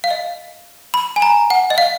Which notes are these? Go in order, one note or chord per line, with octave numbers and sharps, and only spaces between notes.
F5
D#5
B5
G#5
A#5
F#5
D#5
F5